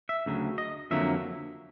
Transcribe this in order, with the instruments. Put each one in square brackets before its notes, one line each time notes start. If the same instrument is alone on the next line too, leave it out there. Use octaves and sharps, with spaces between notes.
[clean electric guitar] E5
D2 C#3 F#3
D#5
F2 D3 F#3 A#3 E5